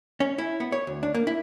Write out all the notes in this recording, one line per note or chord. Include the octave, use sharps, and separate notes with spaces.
C#4
E4
B3
C#5
D2
D4
A#3
E4